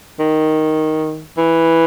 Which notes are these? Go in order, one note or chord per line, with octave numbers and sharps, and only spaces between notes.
D#3
E3